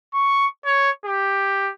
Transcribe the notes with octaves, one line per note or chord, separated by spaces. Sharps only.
C#6
C#5
G4